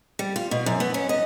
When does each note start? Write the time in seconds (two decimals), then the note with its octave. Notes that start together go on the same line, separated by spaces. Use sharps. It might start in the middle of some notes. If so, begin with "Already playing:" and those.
0.19 G3
0.36 F4
0.51 B2
0.66 F#2
0.80 B3
0.94 C#4
1.09 D#5